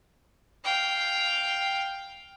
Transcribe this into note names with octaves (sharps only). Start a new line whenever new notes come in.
F5 G5